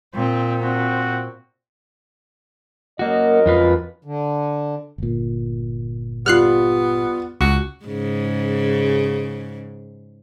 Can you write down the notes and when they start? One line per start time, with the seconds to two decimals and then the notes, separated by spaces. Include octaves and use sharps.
0.15 A#2 C4
0.63 C4 F#4
2.99 F#2 A#3 F#4 A#4 D#5
3.46 F2 F4 B4
4.05 D3
4.98 G1 A#2
6.26 G3 B3 F4 F6 F#6 C7
7.41 C#2 F#4
7.85 G#2 C#3